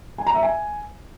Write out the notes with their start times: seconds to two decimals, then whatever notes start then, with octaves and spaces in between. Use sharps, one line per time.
0.18 G#5
0.27 A#5
0.35 E5
0.43 G#5